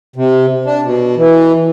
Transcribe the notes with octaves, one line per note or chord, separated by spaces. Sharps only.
C3
D4
B2
E3